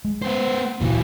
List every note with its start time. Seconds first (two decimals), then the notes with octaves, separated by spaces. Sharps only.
0.05 G#3
0.22 B3 C5
0.81 D2 A#2 C#3 E3 F#3